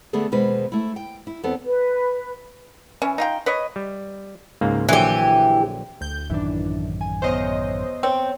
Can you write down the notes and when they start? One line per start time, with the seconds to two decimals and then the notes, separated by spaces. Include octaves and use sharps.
0.13 D3 A3 B3 G#4 A4
0.32 D#2 B2 G#3 B4 C5
0.72 A3 E4
0.96 G5
1.27 E4
1.43 E2 B3 C4 A4
1.66 B4
3.02 E3 C#4
3.18 D#4 F4 G5
3.46 B4 C#5 D#5
3.76 G3
4.61 C#2 G#2 A#3
4.89 A#1 D3 E3 F#3 G4
6.01 D2 G6
6.30 A1 F#2 D#3 E3 D4
7.01 G#5
7.22 E2 C5 C#5 D#5 F5
8.03 C4 C#5 G5